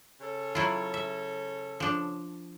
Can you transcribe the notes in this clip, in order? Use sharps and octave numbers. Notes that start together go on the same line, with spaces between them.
C#3 A4 C#5
F#3 E4 F4
E5
F3 D4